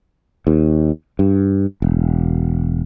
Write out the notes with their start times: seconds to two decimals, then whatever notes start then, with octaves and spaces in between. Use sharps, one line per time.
0.47 D#2
1.19 G2
1.82 E1